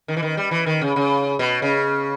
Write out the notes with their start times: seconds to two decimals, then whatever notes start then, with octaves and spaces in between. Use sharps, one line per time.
0.08 D#3
0.17 E3
0.22 D#3
0.37 G3
0.51 E3
0.66 D#3
0.81 C#3
0.96 C#3
1.39 B2
1.62 C#3